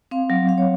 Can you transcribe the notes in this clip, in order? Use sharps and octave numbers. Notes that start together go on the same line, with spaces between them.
C4 F5
F#3
F#3 F5
C#5